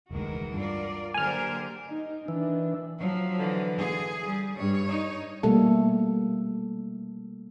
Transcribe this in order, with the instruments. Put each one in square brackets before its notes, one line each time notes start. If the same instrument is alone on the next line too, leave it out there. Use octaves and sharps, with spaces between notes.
[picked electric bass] F1 D2 [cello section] D#3 G#3 A#4 [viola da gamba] E3 F#4
[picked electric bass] G2 [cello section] F4 A#4 D5
[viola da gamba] D3 F#3 A#4 [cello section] A#3 G4 C5 [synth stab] G#5 F6
[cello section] D#4
[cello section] D#3 D4 [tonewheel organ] E3
[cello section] F3 F#3
[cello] D3 E3
[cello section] G#4
[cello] G3
[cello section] G2 [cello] C#5
[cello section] D#4
[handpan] B2 G3 A3 A#3 A4